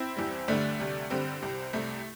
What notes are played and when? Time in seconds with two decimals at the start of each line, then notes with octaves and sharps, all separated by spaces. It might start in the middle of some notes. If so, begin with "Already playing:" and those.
Already playing: C4 E4
0.17 E2 E3 G3
0.48 D2 D3 G3 A3 D4
0.79 D2 C3 G3
1.10 G2 D3 G3 C4
1.42 C2 C3 G3
1.73 C2 C3 G3 A3